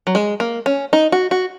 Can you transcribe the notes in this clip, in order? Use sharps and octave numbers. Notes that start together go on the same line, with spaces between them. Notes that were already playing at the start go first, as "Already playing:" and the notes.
F#3
G#3
A#3
C#4
D#4
F#4
F#4